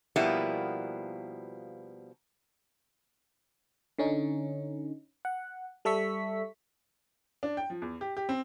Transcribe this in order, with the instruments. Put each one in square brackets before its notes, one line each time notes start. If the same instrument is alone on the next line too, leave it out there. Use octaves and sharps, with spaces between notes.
[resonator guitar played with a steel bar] B2 F3 G3 A#3 B3 E4
[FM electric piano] D3 C#4 D#4
F#5
G3 A4 E5 C#6 B6
[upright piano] D4
G5
F3
E2
G4
G4
C4